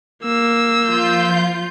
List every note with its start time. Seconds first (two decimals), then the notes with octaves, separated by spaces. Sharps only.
0.23 A#3 E6
0.87 F3 F4 G6